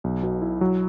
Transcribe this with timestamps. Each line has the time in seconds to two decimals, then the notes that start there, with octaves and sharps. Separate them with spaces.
0.04 B1
0.23 B2
0.42 E4
0.61 F#3